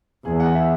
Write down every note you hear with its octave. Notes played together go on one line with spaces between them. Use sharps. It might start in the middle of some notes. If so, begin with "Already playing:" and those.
E2 G#4
F#5
E5